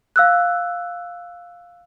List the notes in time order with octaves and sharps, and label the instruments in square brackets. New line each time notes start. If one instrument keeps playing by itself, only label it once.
[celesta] F5 E6 F#6